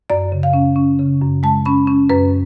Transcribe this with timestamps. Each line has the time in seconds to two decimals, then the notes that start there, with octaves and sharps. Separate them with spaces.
0.10 F#2 D5
0.32 C#3
0.43 F5
0.53 C#4
0.76 C#4
0.99 C#3
1.21 F#2
1.43 G#3 A5
1.66 C#4 B5
1.87 C#4
2.10 F#2 B4